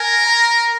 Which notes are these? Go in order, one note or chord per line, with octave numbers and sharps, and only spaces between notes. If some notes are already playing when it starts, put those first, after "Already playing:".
Already playing: A#4 G#5
A#5